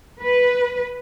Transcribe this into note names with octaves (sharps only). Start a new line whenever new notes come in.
B4